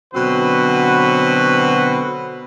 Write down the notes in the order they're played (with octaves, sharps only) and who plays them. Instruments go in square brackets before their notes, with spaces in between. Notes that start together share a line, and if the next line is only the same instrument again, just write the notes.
[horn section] B2 D3 F#3 C4 F#4 B4